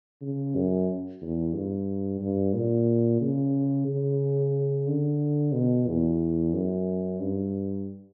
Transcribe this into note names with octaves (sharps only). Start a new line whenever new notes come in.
C#3
F#2
E2
G2
G2
A#2
C#3
C#3
D3
B2
E2
F#2
G2